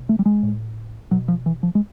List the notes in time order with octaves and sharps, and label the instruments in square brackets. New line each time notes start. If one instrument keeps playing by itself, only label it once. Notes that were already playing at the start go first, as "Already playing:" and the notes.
Already playing: [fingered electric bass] B2
A3
G3
G#3
A2
B2 F#3
F3
E3
F3
G#3